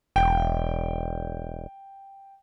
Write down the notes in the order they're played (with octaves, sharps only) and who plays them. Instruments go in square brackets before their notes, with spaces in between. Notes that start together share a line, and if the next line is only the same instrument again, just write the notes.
[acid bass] E1 [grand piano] G5